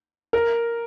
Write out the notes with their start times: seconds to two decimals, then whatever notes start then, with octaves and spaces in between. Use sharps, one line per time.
0.33 A#4